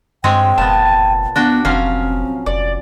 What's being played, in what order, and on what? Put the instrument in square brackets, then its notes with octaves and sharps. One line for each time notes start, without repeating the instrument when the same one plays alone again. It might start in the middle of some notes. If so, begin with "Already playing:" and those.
[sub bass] G2 [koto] G#3 C4 C#5 [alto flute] G5
[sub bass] F1 [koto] A#2 B3 [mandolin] A5
[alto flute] B3 [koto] D4 F#4 G5
[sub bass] F1 [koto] F3 F#3 C#4 [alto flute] C4 [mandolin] F5
[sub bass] F1 [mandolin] D5